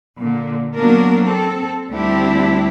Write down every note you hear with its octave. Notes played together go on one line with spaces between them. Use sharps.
A#2 D3
F#3 A#3 B3 D4 A#4
C4 A4
D2 G3 C4 D4 E4 G4